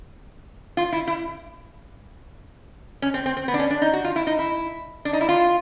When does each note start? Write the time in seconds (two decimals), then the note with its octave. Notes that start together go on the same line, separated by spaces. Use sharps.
0.77 F4
0.92 E4
1.07 E4
3.02 C#4
3.14 C4
3.26 C4
3.37 C4
3.48 B3
3.54 D4
3.59 C#4
3.70 D4
3.82 D#4
3.93 F#4
4.04 F4
4.16 E4
4.27 D#4
4.39 E4
5.05 D4
5.13 D#4
5.21 E4
5.29 F4